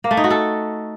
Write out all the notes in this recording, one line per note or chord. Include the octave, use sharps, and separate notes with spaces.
A#3
A3
D#4
F#4
A4